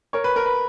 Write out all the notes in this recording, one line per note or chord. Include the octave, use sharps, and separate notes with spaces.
A#4 C#5
B4
A#4
B4